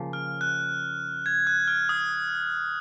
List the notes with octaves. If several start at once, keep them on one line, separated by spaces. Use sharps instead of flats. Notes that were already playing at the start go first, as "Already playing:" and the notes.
Already playing: C#3 F3 A#3
F6
F#6
G#6
F#6
F6
D#6